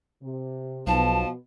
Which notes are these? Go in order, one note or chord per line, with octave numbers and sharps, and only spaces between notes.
C3
B1 B2 F3 B3 A5